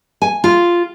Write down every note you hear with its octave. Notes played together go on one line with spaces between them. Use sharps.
G#5
F4